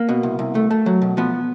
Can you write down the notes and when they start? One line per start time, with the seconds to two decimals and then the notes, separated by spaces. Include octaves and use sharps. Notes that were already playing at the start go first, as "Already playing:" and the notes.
Already playing: A#3
0.09 B2
0.23 C2
0.39 C2
0.55 A3
0.71 A3
0.86 F#3
1.02 B2
1.17 F3 B3